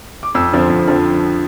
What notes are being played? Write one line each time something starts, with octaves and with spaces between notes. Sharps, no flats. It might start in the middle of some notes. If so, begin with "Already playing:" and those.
D6
F2 E6
D3 F3 C4
F2
D3 F3 C4